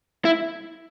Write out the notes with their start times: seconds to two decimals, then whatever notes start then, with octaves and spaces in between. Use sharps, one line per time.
0.25 E4